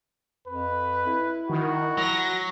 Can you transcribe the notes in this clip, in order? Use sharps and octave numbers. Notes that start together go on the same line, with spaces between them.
F2 B4
E4
D#3 F#4
F#3 A#6